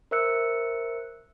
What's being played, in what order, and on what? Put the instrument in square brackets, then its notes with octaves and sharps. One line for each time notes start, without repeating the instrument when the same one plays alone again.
[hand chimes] A#4 C5 E5 E6 F#6 C#7